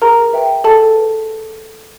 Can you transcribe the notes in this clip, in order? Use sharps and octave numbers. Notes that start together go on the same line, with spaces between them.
G#4 A#4 A#5
B4 E5 G5
G#4 A4 A5
B4